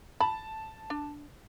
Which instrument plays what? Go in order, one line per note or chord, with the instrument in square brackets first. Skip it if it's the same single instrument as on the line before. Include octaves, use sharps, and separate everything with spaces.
[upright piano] A5 [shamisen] B5
[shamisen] D4